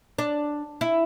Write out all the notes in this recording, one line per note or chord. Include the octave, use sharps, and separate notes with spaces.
D4
E4